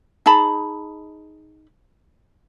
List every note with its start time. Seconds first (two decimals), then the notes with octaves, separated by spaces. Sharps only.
0.26 D#4 G#4 A5 B5